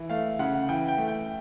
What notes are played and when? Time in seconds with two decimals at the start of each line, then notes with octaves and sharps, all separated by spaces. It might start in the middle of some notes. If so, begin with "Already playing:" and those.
Already playing: E3
0.10 A3 F5
0.39 C#3 F#5
0.69 E3 G5
0.88 G5
0.98 A3
1.08 G5